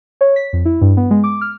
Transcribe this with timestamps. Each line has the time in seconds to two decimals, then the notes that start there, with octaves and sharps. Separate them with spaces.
0.21 C#5
0.36 B6
0.53 F2
0.65 E4
0.81 G2
0.97 B3
1.11 G#3
1.24 D6
1.41 F6